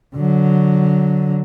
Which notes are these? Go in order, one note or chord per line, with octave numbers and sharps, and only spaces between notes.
D3 F#3